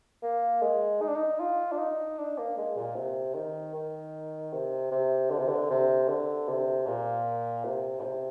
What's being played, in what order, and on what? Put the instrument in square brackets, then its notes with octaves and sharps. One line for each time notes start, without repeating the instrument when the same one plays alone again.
[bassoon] A#3
G#3
D#4
D4
D#4
F4
D4
D#4
D4
A#3
G#3
A#2
C3
D#3
D#3
C3
C3
D3
C3
D3
C3
D3
C3
A#2
C3
A#2
C3